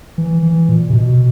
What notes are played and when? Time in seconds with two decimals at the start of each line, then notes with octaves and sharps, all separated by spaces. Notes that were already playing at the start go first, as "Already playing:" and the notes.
0.18 E3
0.43 E3
0.69 A#2
0.90 C3
0.93 B2